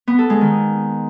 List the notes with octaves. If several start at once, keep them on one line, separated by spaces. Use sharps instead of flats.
B3
A4
G#3
D#3